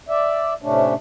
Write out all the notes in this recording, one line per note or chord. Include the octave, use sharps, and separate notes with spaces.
D5 E5
A2 C3 A3 C#4 D4